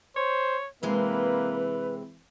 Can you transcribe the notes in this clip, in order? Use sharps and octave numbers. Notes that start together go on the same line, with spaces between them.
C5 C#5
C3 E3 G#3 A#3 C4 B4